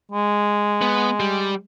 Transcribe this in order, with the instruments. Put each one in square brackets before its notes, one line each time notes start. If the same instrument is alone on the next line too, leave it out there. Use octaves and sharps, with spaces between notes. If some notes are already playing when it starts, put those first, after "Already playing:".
[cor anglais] G#3
[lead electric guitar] B3
G3